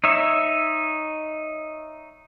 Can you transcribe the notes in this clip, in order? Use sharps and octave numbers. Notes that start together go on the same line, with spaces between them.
D#4 C#5 E5